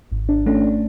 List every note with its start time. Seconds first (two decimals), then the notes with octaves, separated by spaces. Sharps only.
0.12 G#1
0.29 D4
0.46 A3 C#4 D4
0.64 D4